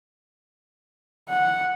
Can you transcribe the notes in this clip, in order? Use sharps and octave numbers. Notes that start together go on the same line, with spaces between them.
F#5